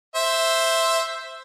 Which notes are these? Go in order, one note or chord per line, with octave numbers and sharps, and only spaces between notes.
C5 E5